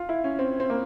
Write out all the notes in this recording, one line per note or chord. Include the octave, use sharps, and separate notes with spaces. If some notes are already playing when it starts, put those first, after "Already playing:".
Already playing: F4
E4
C#4
C4
C4
A#3